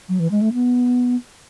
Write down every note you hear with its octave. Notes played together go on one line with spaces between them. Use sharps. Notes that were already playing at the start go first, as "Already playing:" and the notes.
F#3
E3
G#3
A3
B3